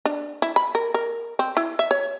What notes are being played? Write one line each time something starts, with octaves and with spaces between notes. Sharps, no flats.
D4
E4
B5
A#4
A#4
C4
E4
E5
C#5